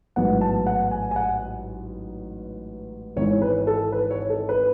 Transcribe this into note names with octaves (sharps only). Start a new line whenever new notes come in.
A1 G#2 F#3 B3 F#5
A5
F#5
G#5
G#5
F#5
G#1 G#2 E3 C#5
B4
A4
B4
C#5
A4
B4